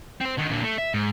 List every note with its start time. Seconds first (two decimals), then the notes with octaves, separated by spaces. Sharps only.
0.20 C4 C5
0.37 D3 D#3
0.51 A#2 D3
0.63 A3
0.78 E5
0.94 G#2